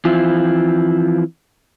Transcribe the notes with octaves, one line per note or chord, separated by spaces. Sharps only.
E3 F3 C4 E4 F4